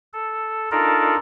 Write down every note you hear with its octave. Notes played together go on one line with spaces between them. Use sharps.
A4
D4 D#4 F4 A4 A#4 D5